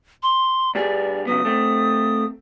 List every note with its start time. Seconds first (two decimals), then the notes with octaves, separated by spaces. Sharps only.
0.23 C6
0.75 G2 G3 G#4 D5
1.27 C#3 F#3 B3 D#6
1.45 A3 C4